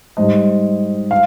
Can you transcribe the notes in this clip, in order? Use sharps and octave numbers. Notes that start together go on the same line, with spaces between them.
G#2 G3 C5 D#5
F5